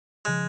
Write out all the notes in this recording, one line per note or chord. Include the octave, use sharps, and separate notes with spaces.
C#3 F3 G#3